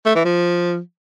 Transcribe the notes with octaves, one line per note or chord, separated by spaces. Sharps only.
A3
E3
F3